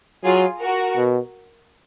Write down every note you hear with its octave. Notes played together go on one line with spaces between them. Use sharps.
F#3 F4 G#4
F#4 A#4
B2